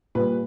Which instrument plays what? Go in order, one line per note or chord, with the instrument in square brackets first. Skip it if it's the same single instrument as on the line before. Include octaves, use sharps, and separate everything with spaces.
[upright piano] A#2 G3 B4